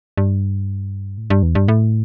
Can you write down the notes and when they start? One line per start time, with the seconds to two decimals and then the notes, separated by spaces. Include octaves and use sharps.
0.17 G2
1.18 A2
1.30 G2
1.43 E2
1.55 G2
1.68 A2